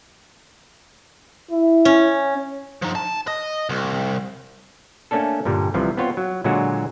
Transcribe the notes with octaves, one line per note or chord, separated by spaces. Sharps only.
E4
C#4
F3 D#4
A5
D#5
C2
A3 A#3 C#4 D4 A4
G2 A#2 D3 G3
C2 C3 E3 F3
B3 C4 F4 C#5
F#3
A#2 D3 F#3 G#3 F4 F#4